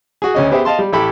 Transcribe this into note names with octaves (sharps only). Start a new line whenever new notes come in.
F#4 G#4
D2 C#4 D#5
B3 G4 G#4 C5 E5
D#5 F5 A5 C6
G3
A1 E4 G4 A4 B5